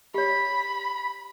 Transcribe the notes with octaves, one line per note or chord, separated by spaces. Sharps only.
G4 C#5 B5